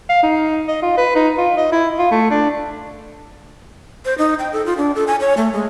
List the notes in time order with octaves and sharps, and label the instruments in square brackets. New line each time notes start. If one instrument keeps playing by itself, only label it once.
[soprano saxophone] F5
D#4
D#5
F4
B4
D#4
F4
D#5
E4
F4
A3
D4
[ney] C5
D#4
G5
A4
F4
D4
A4
G#5
C#5
A3
G#3